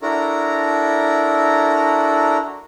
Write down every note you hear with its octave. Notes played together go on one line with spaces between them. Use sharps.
D4 E4 F#4 A4 A#4 A#5